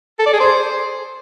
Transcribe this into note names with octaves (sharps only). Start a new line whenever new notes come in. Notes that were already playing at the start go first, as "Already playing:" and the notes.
A4
D5
G#4
C5